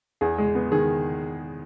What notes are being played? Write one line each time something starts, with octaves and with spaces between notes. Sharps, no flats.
E2 G#4
G#3
B3
D#3 G#4